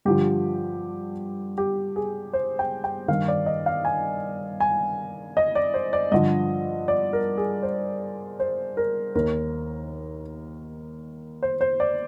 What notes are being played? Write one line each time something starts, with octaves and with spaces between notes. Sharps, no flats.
G2 D3 F3 G4
G4
G#4
C5
G5
G5
G2 D#3 F5
D5
D#5
F5
G#5
G#5
D#5
D5
C5
D5
G2 D3 F3 D#5
D5
A#4
G#4
C5
C5
A#4
D#2 D#3 A#4
C5
C5
D5